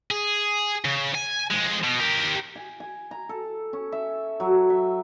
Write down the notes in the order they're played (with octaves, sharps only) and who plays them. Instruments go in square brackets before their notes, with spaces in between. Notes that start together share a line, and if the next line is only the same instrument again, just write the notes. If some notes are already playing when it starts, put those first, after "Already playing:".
[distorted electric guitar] G#4
C#3
G#5
F2 G#3
B2
G4 A#4
[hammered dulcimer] G#5
G#5
A#5
A4
C#4
E5
F#3
E5